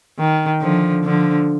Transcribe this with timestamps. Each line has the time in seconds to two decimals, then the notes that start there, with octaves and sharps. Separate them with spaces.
0.19 D#3
0.61 D3 F3
1.04 D3 F3